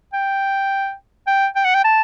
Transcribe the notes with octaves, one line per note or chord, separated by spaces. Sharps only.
G5
G5
G5
F#5
G5
A5